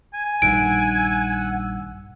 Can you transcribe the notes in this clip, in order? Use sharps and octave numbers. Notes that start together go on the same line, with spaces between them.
G#5
A#1 G2 D#3 F#5 E6 D7